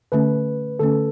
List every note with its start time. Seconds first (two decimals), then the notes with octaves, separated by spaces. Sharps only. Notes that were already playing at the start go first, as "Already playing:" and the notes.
0.12 D3 A3 C#4 B4
0.79 D3 A3 C#4 A4